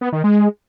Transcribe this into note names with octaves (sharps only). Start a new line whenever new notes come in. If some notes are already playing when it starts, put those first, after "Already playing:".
B3
D#3
G#3